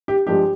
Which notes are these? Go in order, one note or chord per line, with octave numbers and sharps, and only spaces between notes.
G4
G2 F3 G#3 G4